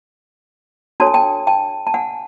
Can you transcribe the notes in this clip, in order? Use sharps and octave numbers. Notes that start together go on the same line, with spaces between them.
D4 F#4 A4 C#5 A5
G#5
G5 A5
G5 A5
A5
F#5 G#5